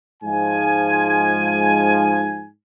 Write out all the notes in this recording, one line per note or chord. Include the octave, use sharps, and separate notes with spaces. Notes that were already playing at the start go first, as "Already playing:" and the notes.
G#2 F3 G#5